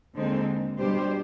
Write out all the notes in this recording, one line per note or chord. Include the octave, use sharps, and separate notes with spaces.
D#2 D3 G#3 C4 D#4
B2 G3 D4 G4 C5